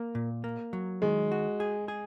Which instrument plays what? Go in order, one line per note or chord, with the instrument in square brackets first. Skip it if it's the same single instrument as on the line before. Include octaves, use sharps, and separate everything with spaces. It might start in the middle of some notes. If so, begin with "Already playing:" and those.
Already playing: [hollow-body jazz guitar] A#3
A#2
A#3
F#3
[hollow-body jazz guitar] D#3 [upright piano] G#3
[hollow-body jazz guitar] F#4
G#4
G#4